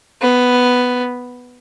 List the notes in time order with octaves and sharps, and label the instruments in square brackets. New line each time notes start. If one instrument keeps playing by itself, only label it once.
[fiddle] B3